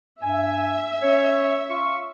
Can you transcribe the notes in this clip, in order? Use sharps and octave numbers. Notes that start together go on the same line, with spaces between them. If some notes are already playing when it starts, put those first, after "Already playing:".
G2 E5 G#5
C#4 C#5
F4 C#6